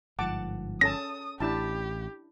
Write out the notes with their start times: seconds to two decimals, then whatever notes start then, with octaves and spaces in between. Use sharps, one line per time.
0.19 G1 G#2 F3 F#5 A5 D6
0.81 C#4 A4 A5 D#6 A#6
1.40 A1 D4 E4 G4 A5